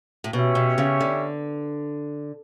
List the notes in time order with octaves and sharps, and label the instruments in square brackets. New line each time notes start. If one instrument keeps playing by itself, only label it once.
[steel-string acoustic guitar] A2
[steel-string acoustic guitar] B2 [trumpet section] C#4 G4 C#5 E5
[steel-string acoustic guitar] B2
C#3
D3